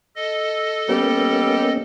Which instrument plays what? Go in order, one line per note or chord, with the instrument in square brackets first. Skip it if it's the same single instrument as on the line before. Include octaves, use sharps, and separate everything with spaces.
[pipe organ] A4 D#5
[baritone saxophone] G3 [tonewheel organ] A#3 B3 C#4